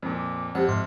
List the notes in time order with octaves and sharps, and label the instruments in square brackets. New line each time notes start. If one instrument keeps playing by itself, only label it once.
[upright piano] F2 A#2
[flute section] D6
[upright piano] F2 [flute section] G4 C5 [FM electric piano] F#5
[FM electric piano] G#2 C6 [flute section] E5 D6 F6